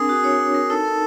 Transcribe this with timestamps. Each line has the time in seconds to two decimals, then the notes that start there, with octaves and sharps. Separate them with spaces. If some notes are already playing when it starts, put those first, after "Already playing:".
Already playing: C4 D4 G#4 A#4
0.09 F#4
0.24 C#5
0.40 D4
0.54 A#4
0.69 D#4 A4
0.85 A#4